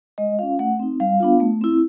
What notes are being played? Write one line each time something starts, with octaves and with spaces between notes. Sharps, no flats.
G#3 D#5
C#4 F4 F5
A3 F#5
C4 D#4
G3 F5
B3 D4 F4
A3
C4 E4